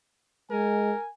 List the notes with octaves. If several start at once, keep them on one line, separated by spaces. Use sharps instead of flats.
G#3 A#4 G#5